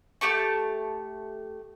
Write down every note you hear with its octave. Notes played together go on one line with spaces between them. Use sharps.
A3 G4 A5 C#6